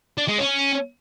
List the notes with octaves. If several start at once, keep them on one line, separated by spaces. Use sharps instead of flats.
D4
G#3
C#4